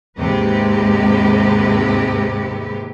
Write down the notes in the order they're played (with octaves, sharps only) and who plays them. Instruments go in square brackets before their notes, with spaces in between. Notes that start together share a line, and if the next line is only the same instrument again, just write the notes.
[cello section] D#2 G#2 C3 G#3 G4 B4